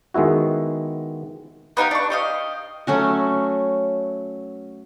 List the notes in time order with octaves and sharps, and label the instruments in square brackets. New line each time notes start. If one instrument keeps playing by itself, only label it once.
[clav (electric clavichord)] D#3 G#3 B3 E4 F#4
[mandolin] B3 D#4 G4 F5
D4 C#6
G4 D#5 F5
[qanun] F#3 A3 C#4 F#4